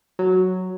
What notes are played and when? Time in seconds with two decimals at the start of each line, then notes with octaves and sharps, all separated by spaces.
0.19 F#3